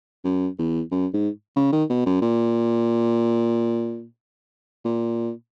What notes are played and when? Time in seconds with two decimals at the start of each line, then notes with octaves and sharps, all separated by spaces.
0.25 F#2
0.58 E2
0.91 F#2
1.13 G#2
1.56 C#3
1.72 D#3
1.89 B2
2.06 F#2
2.22 A#2
4.84 A#2